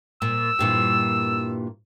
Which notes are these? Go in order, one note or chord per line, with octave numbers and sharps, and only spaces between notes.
A#2 E6
G2 A#2 E3